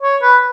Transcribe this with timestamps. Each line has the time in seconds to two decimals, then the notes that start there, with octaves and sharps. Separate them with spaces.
0.02 C#5
0.22 B4